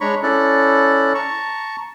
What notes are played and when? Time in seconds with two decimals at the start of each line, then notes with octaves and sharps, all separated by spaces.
0.01 G#3 D4 C#5 A#5 B5 C#6
0.23 C#4 E4 A4 D5 F#6
1.15 A5 A#5 C#6